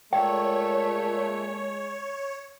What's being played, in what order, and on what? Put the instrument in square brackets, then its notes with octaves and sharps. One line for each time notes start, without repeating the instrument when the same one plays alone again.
[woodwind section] A#2 A3 [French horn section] G#3 [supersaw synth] C#5 [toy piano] G5